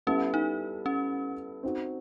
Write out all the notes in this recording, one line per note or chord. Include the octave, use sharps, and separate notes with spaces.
G3 B3 C#4 E4 A4
D#4
C#4
C4 D#4 F#4